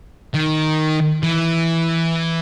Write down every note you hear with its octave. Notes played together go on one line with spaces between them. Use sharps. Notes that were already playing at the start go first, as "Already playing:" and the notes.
D#3
E3